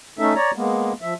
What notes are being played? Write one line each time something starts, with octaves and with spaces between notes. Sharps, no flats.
A3 C#4 D#4 A4 E5
C#5 D5 A#5
G#3 A#3 B3
F3 E5